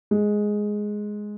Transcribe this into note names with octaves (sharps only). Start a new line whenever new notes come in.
G#3